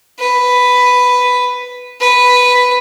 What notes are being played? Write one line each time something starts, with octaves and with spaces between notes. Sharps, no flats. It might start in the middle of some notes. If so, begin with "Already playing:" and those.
B4
B4